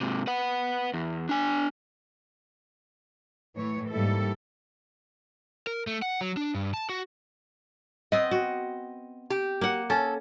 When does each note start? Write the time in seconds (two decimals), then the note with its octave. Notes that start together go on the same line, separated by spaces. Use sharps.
0.01 G#2 C3
0.27 B4 F#5
0.94 E2
1.29 D4 G#5
3.56 A2 E3 A3 C#5
3.90 G#2 G3 A#3 E4 A4
5.67 A#4
5.87 A3
6.02 F#5
6.21 F#3
6.37 D4
6.55 G2
6.74 A5
6.89 F#4
8.12 B3 C4 D#5
8.31 F#4
9.30 G4
9.61 A#3 F#5
9.90 C#4 A4